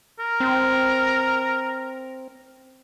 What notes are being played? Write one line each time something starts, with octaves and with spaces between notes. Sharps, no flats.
A#4
C4